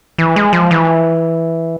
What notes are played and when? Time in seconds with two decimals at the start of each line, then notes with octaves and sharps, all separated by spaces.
0.18 E3
0.36 G#3
0.53 F3
0.71 E3